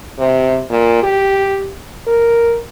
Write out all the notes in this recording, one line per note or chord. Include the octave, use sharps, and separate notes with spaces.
C3
A#2
G4
A#4